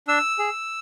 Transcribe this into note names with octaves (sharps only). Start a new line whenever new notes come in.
D4 E6
G#4